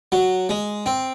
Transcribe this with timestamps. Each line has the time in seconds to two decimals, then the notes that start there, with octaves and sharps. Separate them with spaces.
0.12 F#3
0.49 G#3
0.86 C4